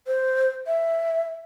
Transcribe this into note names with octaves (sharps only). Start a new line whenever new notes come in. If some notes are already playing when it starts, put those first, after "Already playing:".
C5
E5